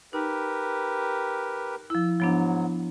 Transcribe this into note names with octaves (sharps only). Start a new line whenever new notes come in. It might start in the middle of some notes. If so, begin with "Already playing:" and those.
D#4 G4 A#4 B4
F3 E4 E6
G#2 F3 F#3 B3 D4